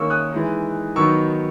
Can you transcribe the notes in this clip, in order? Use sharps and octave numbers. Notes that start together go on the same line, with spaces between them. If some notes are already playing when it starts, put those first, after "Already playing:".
Already playing: D#3 A#3 C#4 C#6 E6
D#6 F#6
E3 G#3 D#4
D#3 F#3 B3 D#4 C#6 E6